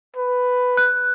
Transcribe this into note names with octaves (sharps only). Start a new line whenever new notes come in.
B4
F#6